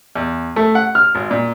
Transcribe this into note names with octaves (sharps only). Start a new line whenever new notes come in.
E2
A3
F#5
F6
G#1
A#2